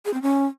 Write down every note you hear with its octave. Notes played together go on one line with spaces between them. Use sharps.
G#4
C4
C#4